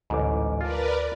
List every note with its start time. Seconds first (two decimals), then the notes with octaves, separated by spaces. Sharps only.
0.10 A1 D2 G#2 D6
0.61 F4 A#4 B4 D5 A5